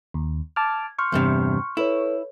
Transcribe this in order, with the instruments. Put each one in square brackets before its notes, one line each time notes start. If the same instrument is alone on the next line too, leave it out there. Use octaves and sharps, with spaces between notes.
[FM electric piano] D#2
[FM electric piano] A5 D6 F6 [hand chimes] G#6
[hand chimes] C6 F6 G6 [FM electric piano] C#6
[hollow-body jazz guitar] E2 G2 C3
[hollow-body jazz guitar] E4 [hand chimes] A4 B4 C#5